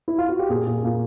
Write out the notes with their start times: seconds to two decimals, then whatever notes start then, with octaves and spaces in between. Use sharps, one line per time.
0.08 E4
0.18 F4
0.29 F#4
0.39 G4
0.50 A#2 G#4
0.67 A#2
0.84 A#2